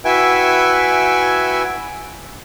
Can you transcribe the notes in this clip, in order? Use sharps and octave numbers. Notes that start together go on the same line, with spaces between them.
E4 F#4 B4 E5 G5 G#5